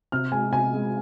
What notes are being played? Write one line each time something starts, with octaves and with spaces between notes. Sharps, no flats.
C3 F6
G#3 G#5
C3 G#5
G#3